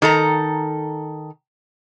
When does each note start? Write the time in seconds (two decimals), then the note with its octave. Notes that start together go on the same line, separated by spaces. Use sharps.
0.02 D#3 A4 A#5